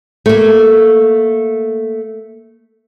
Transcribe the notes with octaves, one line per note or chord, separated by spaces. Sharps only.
A3 A#3